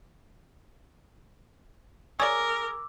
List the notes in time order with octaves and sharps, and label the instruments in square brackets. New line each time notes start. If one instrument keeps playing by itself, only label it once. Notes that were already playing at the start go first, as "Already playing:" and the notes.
[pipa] G#4 [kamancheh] A#4 [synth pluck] C#5 D5 [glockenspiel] D6 E6